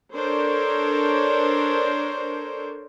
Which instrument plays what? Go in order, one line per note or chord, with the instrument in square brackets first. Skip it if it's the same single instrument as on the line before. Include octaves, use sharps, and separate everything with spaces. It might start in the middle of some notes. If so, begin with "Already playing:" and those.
[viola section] D4 A4 A#4 C5 C#5